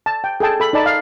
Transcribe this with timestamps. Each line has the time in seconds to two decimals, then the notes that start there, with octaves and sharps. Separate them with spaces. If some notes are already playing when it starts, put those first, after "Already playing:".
0.06 A5
0.24 G5
0.40 G#4 A4 G5 A5
0.60 A4 B5
0.73 D#4 D5 A5 B5
0.86 F5